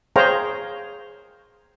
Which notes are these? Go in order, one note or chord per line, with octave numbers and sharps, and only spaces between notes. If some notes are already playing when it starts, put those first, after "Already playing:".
G#4 C5 C#5 F5 G5 A#5